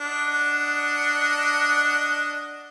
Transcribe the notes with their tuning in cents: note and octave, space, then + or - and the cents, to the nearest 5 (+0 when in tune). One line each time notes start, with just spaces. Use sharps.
D4 +0 D#5 +0 F#5 +0